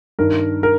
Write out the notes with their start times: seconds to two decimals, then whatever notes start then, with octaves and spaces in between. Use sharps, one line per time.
0.19 G2 D#3 A#4
0.63 A#4